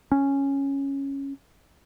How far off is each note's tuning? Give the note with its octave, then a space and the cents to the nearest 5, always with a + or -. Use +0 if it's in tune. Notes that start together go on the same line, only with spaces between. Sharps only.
C#4 -5